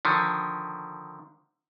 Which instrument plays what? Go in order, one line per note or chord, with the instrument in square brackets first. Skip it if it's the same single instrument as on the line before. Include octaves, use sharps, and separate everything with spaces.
[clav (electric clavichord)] D3 D#3 F3